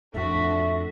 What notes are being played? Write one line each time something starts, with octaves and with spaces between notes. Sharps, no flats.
F2 A2 D4 F#4 A4 E5